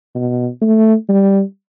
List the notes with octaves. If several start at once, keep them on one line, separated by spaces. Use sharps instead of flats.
B2
A3
G3